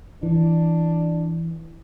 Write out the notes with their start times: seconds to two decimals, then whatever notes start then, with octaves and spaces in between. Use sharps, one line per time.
0.23 E3 D4